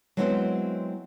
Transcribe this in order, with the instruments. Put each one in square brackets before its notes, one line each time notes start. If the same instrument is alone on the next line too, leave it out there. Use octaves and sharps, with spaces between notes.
[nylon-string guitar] F#3 G#3 B3 C4 E4 C5